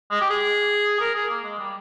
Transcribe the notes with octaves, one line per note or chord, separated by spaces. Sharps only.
G#3
G4
G#4
A#4
G#4
A#3
G#3
G3